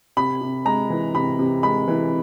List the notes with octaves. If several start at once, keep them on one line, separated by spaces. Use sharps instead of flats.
C3 B5
C3
G#3 A#5
E3
C3 B5
C3
G#3 B5
E3